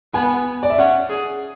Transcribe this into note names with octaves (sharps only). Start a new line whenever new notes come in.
B3 G#5
D5
E5
C#4 F#5
G#4